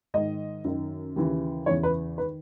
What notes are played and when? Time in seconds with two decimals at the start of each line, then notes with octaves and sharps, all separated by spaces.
0.14 G#2 D#3 D#5
0.64 F#2 D#3
1.16 D#2 C#3 E3
1.66 E2 C#3 E3 C#5
1.83 B4
2.17 D#3 B4